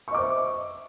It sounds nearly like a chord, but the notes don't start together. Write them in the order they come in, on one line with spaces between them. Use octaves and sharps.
C#6 D#5 D6 C5 E5